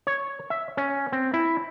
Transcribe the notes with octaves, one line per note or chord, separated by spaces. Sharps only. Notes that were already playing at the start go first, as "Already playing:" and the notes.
C#5
E5
C#4
C4
E4